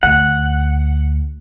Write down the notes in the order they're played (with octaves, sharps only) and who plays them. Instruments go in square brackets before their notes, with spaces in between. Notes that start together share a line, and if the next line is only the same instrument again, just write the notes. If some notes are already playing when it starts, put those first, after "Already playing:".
[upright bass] D2 [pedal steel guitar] F#5